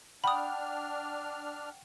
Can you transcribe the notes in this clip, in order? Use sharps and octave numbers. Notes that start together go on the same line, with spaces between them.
D4 F#5 G5 B5 D#6 F6